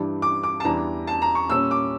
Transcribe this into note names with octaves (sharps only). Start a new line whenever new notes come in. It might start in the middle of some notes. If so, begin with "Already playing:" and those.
Already playing: G2 E3 G3 D4
D6
D6
A5
E2 E3 G3 D4 A#5
A5
A#5
C#6
A#2 G3 C#4 E6
D6